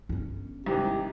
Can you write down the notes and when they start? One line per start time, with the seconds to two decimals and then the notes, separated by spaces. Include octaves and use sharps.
0.09 G1 C#4
0.66 C2 G#2 D#3 G4